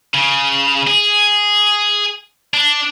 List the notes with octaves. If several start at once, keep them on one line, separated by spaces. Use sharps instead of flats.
C#3
G#4
D4